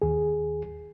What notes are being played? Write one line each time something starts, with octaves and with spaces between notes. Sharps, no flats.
D#2 G#4